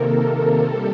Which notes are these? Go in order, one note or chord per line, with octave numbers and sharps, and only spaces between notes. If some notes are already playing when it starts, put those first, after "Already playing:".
Already playing: C3 D#3 A#3 A4 A#4
C3 G3